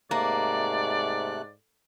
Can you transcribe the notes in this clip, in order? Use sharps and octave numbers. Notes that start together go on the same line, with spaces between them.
G#2 C3 A3 A#3 D5 F#6